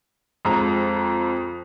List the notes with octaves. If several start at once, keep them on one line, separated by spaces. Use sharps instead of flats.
F2 G#3 A#5